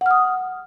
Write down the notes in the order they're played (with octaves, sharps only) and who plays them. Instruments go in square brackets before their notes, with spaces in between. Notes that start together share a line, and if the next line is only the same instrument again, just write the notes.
[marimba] F#5
F6
D#6